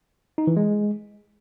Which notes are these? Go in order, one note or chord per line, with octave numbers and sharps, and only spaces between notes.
D#4
E3
G#3